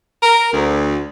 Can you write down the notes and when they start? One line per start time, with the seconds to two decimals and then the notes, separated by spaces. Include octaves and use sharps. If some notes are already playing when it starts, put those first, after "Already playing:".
0.23 A#4
0.52 D2